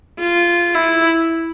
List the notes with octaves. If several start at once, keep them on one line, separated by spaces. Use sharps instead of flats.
F4
E4